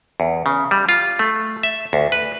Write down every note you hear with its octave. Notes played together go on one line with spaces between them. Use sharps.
E2
C#3
G3
F4
A3
E5
D2
B4